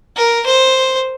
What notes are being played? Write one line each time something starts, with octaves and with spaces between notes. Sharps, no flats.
A#4
C5